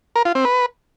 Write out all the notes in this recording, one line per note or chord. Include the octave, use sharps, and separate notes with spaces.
A#4
F4
C4
B4